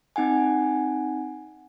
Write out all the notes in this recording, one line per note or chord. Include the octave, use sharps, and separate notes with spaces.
C4 D#4 F#5 G#5